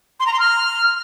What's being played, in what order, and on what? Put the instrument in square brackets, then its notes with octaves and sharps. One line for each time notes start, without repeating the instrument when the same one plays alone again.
[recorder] C6
A#5
C6
F6